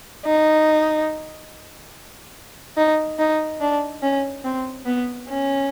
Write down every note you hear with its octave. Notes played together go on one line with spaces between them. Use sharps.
D#4
D#4
D#4
D4
C#4
C4
B3
C#4